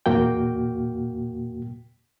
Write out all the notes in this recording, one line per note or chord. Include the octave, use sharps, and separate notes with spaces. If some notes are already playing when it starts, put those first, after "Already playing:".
E2 A#2 A#3 F#4 G5